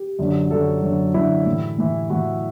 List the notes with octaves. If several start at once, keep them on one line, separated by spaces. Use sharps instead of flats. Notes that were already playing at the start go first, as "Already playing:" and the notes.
Already playing: G4
F#2 D3 F#3
F#2 D3 F#3 A4
F#2 D3 F#3
F#2 D3 F#3 E4
A2 E3
A2 E3
A2 E3 F#4